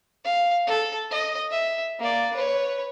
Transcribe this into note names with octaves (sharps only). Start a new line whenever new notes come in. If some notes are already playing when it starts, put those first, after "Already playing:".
F5
A4
D#5
E5
A#3 D5
B4 C#5